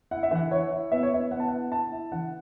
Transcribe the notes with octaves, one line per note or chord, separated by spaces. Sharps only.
E4 F#5
E5
E3 F#5
E4 C#5
E4
B3 E5
C#5
E4 E5
B3 F#5
A5
E4 F#5
E4 A5
E4
E3 F#5